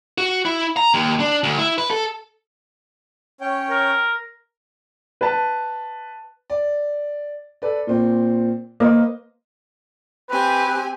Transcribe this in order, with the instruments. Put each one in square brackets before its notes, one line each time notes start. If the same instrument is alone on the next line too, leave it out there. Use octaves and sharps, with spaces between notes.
[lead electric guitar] F#4
E4
A#5
D#2
D4
D2
E4
B4
A4
[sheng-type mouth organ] C#4 C#5 G5
[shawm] A#4
[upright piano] B4 A5
[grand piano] D5
A4 B4 D5
A#2 C4
[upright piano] A#3 [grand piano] B4 C5 D#5
[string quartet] C4 G4 G#5 [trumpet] B4